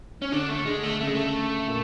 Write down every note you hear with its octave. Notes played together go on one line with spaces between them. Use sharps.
C#4
D3 D4
A3
D3 G#3
A3
C#3 A3
G#3
A3
A#2